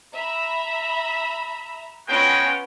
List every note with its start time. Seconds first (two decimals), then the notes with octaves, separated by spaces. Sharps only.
0.13 E5 A#5 B5
2.07 G#3 B3 C#4 F4 F#4 G5